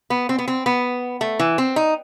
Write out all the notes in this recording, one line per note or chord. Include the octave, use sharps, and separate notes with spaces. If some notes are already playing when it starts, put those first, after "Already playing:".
B3
C4
B3
C4
B3
A3
E3
C4
D#4